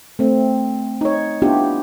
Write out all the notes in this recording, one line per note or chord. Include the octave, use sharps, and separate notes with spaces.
A3 C4
D#4 C#5
B3 D4 E4 F4 G4